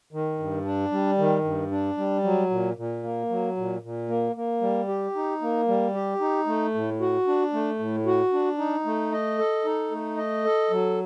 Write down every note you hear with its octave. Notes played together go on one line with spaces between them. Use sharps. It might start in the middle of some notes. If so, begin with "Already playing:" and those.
D#3
G2
D4
G3
D#3
G2
D4
G3
F#3
A#2
A#2
A#3
F#3
A#2
A#2
A#3
A#3
G3
G4
D#4
A#3
G3
G4
D#4
A3
A2
F#4
D4
A3
A2
F#4
D4
D#4
A3
D#5
A4
D#4
A3
D#5
A4
F#3